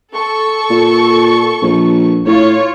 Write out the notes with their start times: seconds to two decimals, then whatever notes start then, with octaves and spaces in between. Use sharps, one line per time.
0.14 A4 C#6
0.70 A#2
1.62 A#1
2.26 A2 F4 C#5